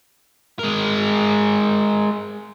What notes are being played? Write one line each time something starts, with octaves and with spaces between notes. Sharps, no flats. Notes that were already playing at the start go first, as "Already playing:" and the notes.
G#3 A#4